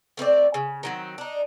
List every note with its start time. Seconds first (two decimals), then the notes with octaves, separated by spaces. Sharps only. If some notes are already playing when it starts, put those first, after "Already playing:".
0.17 A3 C4 C5 D5
0.54 C#3
0.83 D#3 F#3 C4
1.18 D4 D#4